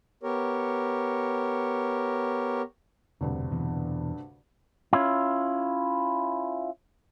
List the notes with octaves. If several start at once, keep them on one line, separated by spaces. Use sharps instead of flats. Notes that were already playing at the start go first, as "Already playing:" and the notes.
B3 G4 A#4 C#5
E1 D2 G2 C3
E2 B2 E3
C#4 E4 F4